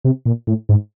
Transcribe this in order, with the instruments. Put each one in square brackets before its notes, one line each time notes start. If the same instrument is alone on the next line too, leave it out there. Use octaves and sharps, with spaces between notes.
[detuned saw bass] C3
A#2
A2
G#2